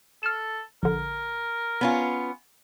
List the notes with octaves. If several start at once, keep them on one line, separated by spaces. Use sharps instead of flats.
A4 F6 E7
A#1 D3 A#4
B3 C#4 F4